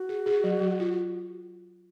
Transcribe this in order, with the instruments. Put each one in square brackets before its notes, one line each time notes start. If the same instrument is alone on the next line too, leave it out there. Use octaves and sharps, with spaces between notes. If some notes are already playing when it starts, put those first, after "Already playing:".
Already playing: [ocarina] F#4
[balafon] G#4
G#4
F#3
F#3
F4